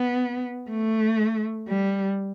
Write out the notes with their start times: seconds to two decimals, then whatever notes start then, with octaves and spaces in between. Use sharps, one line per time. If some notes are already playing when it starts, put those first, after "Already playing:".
Already playing: B3
0.70 A3
1.69 G3